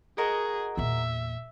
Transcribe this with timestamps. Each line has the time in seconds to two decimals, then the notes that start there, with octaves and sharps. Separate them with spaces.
0.18 F#4 G#4 A#4 D#5
0.77 E2 A#2 E5